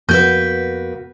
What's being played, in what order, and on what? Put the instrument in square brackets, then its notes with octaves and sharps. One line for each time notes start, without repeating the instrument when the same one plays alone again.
[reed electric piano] F2 B3 [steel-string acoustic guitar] A#3 F#4 B4 [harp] G6